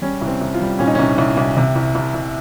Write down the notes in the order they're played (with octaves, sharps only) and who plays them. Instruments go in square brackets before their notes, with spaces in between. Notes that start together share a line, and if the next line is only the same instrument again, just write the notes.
[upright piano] G3 C#4
C2
C4
C2
F4
G3
A#2 C#4
D#4
C2 C#4
C2
C2
C3
C2
C2
C2